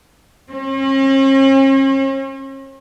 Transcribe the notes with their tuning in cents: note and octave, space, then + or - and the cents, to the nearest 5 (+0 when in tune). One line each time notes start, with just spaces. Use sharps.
C#4 -45